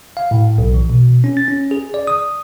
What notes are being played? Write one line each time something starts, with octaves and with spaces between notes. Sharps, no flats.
F5
A2
B1
E3
B2
C#4
A6
C#4
G#4
D5
D#6